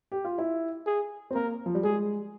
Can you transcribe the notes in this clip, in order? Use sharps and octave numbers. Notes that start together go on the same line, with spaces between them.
G4
F4
E4
G#4
C4
A#3 A#4
F3
G3
G#3 G#4